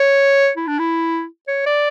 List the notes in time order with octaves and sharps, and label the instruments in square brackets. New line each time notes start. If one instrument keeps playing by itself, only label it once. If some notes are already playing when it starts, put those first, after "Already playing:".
Already playing: [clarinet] C#5
E4
D4
E4
C#5
D5